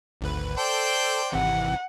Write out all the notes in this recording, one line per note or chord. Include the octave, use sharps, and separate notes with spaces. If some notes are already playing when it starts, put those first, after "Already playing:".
G#1 D2 B4
A4 C5 D5 G5
G#1 C3 E3 F#5